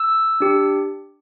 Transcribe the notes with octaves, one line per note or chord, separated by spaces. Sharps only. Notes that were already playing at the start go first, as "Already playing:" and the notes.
Already playing: E6
D4 G4